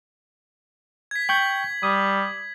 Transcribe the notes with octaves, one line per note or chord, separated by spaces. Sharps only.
G#6 B6
G5 C#6 G6 F#7
G3 D#6